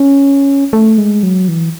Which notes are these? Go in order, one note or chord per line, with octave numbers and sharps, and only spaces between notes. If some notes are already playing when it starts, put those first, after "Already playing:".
Already playing: C#4
A3
G#3
F#3
E3